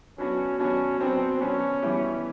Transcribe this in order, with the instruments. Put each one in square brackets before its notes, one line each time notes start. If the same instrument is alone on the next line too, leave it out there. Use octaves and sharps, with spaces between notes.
[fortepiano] F#3 B3 D4 F#4 [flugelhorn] C#4
[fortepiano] F#3 B3 D4 F#4 [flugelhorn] C#4
[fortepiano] F#3 B3 D4 F#4 [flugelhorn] C4
[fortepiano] F#3 B3 D4 F#4 [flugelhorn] C#4
[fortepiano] E3 G3 B3 E4 G4